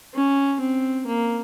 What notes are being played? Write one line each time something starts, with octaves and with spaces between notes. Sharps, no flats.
C#4
C4
A#3